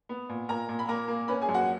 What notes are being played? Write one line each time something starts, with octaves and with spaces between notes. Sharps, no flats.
B3
A#2
A#2 A#4 A#5
A#2
B5
A#3 A#4 A#5
A#3
C#4 B4 B5
G#4 G#5
F#2
F#4 F#5